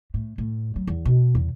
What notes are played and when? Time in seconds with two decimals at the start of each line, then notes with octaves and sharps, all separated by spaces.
0.14 A2
0.38 A2
0.76 F#3
0.87 E2
1.05 B2
1.35 E2